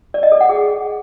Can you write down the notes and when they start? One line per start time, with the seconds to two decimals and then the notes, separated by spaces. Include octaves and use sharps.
0.14 D5
0.23 D#5
0.32 A4
0.41 F#5
0.49 G#4